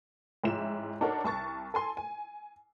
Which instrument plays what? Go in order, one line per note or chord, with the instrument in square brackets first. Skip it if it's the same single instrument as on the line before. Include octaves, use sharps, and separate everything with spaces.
[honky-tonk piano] A1 G#2 F3 E4 E5 E7
D4 D#4 F#4 A4 A#4 C#5
C2 A5 C#6 A6
A4 G#5 C6
G#5